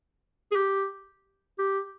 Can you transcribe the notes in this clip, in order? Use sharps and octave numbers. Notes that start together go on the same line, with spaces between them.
G#4
G4
G4